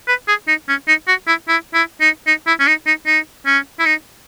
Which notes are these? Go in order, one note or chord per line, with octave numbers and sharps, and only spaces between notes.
B4
G#4
D#4
C#4
D#4
F#4
E4
E4
E4
D#4
D#4
E4
C#4
D#4
D#4
D#4
C#4
E4
D#4